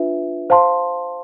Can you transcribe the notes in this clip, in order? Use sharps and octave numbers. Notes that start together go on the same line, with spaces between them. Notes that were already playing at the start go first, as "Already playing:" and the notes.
Already playing: D4 F4 B4 E5
C5 F5 A5 C6